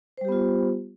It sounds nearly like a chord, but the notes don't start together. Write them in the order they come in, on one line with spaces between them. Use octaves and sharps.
C5 G3 G4 B3 F4